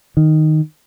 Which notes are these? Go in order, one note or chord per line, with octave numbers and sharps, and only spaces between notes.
D#3